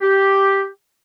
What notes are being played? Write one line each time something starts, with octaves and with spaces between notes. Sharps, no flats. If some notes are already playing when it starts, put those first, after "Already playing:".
G4